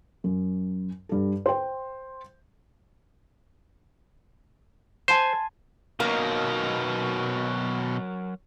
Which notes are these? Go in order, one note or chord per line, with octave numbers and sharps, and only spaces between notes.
F#2
G2 A4
C5 G5
C5 G#5 A5 C6
B2 D#3 F#3 A#3 A#4